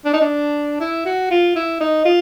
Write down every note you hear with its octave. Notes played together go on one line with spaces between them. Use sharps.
D4
D#4
D4
E4
F#4
F4
E4
D#4
F4